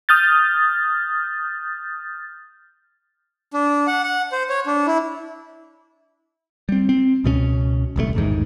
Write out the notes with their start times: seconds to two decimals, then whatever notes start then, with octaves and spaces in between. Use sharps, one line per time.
0.09 D#6 F6 G6 A6
3.54 D4
3.87 F#5
4.03 F#5
4.32 C5
4.49 C#5
4.66 D4
4.87 E4
6.69 G3 C4
6.89 C4
7.24 C#2 B2 G#3 C#4
7.96 D#1 C2 C3 A3
8.15 A1 E2 G#2 D#3